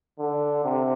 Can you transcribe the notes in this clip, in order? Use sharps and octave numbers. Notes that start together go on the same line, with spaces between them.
D3
C3